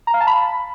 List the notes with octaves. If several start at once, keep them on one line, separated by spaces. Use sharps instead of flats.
A#5
F5
A5
B5